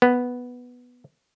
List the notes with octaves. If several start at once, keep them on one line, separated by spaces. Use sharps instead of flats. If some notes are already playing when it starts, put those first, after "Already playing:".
B3